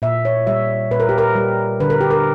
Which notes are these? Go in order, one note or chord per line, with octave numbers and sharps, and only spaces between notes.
A#2 E5
C#5
G3 E5
A#2 B4
A#4
G4
A#4
G3
D3 B4
A#4
G4
A#4